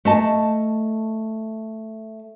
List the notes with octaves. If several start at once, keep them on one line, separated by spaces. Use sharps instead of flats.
A3 D#5 A5